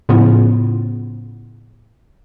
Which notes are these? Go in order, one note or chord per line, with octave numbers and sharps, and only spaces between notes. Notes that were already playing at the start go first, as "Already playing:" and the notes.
A2 C#3 F3 B3 C#4 F4